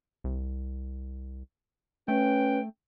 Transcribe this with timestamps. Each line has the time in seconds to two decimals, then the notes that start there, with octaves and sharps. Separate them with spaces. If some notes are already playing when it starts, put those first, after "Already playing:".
0.24 C2
2.08 A3 C#4 B4 G5